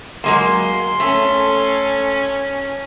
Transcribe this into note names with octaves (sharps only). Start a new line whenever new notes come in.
F#3 G#3 A#3 C6
A3 C#4 A4